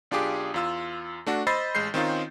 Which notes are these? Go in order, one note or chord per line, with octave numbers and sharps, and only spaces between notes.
B1 D4 F4 G4 G#4 D6
E2 F4 E6
A3 D4 F#4
C5 D#5 B5 E6 A6 C7
A1 G#3 G6 C7
D#3 C4 C#4 D#4 F4